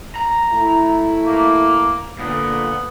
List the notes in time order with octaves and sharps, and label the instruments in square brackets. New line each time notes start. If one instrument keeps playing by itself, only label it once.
[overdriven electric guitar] A#5
[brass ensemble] A3 E4
[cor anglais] A#3
[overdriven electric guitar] A#2 [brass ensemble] D3 [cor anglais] B3